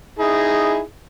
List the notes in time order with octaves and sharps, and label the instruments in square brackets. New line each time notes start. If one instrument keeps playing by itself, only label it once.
[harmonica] D#4 E4 G#4